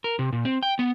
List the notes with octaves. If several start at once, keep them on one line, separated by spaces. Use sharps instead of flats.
A#4
C3
A#2
C4
G5
B3